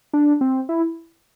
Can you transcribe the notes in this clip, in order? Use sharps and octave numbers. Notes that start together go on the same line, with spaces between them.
D4
C4
E4